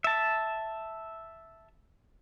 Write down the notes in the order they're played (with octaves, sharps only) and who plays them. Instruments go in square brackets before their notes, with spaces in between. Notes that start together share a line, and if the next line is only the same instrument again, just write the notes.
[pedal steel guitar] E5 A5